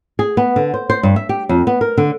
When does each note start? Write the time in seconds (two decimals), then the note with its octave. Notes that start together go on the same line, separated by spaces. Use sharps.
0.19 G#4
0.37 B3
0.56 D3
0.74 C5
0.90 C5
1.03 G2
1.16 E5
1.29 G4
1.49 F2
1.67 B3
1.81 A#4
1.97 D3